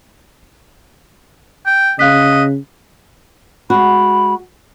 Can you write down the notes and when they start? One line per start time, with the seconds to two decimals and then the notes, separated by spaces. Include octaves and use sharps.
1.66 G5
1.99 C#3 D#5 F5 F#6 B6
3.70 G#3 F#4 B5